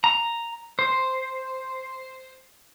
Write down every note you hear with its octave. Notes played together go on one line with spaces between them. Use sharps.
A#5
C5